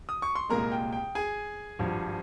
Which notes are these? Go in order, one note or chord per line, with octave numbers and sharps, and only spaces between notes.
D#6
C#6
C6
C2 A#2 G#3 A#4 A#5
G5
G5
G#4 G#5
G#1 G2 F3